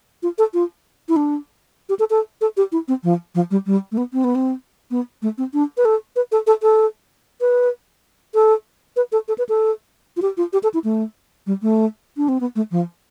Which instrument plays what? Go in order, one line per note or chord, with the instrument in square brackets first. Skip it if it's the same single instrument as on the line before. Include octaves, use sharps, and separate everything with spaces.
[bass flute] F4
A4
F4
E4
D4
G4
A4
A4
A4
G4
E4
C4
F3
F3
G3
G3
A3
B3
C4
B3
C4
B3
A3
C4
D4
B4
A4
B4
A4
A4
A4
B4
A4
B4
A4
A4
B4
A4
F4
G4
F4
G4
A4
E4
A3
G3
A3
D4
C4
B3
A3
F3